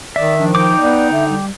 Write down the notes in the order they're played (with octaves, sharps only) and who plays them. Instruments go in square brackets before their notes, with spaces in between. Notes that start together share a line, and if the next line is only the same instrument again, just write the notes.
[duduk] D#3 [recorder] D5 [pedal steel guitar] E5
[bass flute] F3 [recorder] D4
[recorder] D#4 [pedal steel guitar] G5 D6
[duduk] B3 [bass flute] D5
[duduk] D3 [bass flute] E5
[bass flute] G3